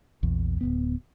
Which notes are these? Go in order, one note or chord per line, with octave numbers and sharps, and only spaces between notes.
A#1 E2
D1 F#2 B3